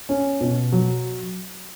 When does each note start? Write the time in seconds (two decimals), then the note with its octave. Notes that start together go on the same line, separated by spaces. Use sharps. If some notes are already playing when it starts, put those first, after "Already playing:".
0.09 C#4
0.41 B2
0.72 F#3